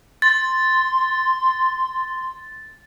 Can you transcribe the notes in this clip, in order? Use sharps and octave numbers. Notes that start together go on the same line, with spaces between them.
C6 A6